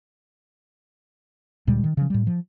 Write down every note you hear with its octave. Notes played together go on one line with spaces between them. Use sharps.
D2 A#2 G3 G#3
D#3
C#3 F3
A2 G3
F3